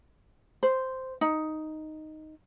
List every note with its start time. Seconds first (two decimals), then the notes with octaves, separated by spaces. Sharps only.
0.63 C5
1.21 D#4